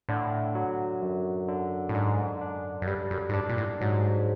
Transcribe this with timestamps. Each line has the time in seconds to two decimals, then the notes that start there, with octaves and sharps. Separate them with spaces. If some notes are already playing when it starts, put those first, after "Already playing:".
0.09 A2 D3
0.55 F#3
1.02 F#2
1.48 D3
1.89 A2
1.94 G#2 D4
2.41 D4
2.82 F#2
2.87 G2 G3
3.11 F#2
3.29 G#2
3.34 G2 D4
3.49 A#2
3.58 A2
3.81 G#2 F#3